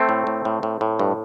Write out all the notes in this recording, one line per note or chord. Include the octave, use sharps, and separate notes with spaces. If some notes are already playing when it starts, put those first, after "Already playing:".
Already playing: A3 C4
A2
A2
A2
A2
A2
G2